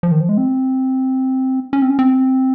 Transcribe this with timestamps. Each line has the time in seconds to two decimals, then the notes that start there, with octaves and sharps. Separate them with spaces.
0.03 F3
0.12 D#3
0.21 F3
0.29 G#3
0.37 C4
1.73 C#4
1.82 C4
1.90 C#4
1.99 C4